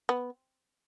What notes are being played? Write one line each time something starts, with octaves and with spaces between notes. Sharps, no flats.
B3